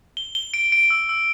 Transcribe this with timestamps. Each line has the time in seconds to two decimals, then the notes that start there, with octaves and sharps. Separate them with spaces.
0.17 G7
0.35 G7
0.54 D7
0.72 D7
0.90 E6
1.09 E6